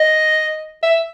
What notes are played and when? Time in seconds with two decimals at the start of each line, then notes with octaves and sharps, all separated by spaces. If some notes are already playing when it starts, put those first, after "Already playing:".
Already playing: D#5
0.83 E5